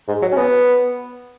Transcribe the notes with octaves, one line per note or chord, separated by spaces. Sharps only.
G#2
F#3
C#4
B3